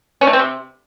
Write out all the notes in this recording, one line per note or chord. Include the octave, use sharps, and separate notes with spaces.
C#4
A3
C4
C3